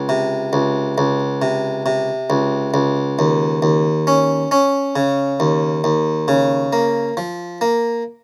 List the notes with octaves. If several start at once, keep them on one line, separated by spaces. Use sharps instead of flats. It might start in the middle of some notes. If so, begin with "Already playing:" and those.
Already playing: C#2
C3
C#2
C#2
C3
C3
C#2
C#2
D#2
D#2
C#4
C#4
C#3
D#2
D#2
C#3
A#3
F3
A#3